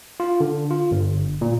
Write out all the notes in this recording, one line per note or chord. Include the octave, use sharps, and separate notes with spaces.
F4
D3
F4
G1
A#2